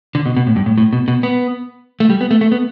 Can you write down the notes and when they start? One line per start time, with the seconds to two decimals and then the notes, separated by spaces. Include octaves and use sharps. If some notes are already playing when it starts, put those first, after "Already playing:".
0.15 D3
0.26 B2
0.37 B2
0.47 A2
0.56 G2
0.66 A2
0.78 A2
0.93 B2
1.08 B2
1.23 B3
2.00 A3
2.10 G3
2.21 B3
2.31 A3
2.41 A3
2.52 B3